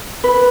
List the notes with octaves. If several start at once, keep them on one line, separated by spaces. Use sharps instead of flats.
B4